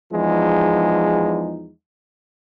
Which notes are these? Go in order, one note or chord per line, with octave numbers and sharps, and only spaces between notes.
E2 F3 G#3 D#4